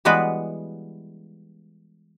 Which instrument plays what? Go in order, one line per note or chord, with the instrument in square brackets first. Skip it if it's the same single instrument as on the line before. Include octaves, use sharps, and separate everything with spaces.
[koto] E3 G3 G#3 B3 F#4 B4